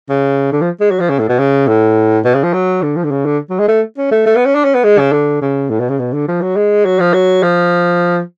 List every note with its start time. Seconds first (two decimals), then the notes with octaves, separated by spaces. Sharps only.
0.09 C#3
0.52 D3
0.61 F3
0.81 G#3
0.91 F#3
1.00 F3
1.10 C#3
1.19 A2
1.29 B2
1.39 C#3
1.67 A2
2.25 B2
2.34 C#3
2.44 F3
2.53 F#3
2.82 D3
2.96 F3
3.04 D3
3.11 C#3
3.25 D3
3.50 F#3
3.59 G#3
3.68 A3
3.98 C#4
4.11 A3
4.26 A3
4.36 B3
4.45 C#4
4.55 D4
4.64 C#4
4.75 B3
4.84 G#3
4.98 C#3
5.12 D3
5.41 C#3
5.70 A2
5.80 B2
5.89 C#3
5.99 B2
6.13 D3
6.28 F3
6.42 F#3
6.56 G#3
6.85 F#3
6.99 F3
7.14 F#3
7.43 F3